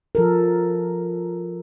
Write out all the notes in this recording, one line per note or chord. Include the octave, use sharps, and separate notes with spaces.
F3 A4 A#4